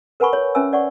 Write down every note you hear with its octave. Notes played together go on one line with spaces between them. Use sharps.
A#4 B4 F#5 G#5 B5 C#6
C#5
C#4 B4 E5 G#5 E6
C#5 D5 F#5 C#6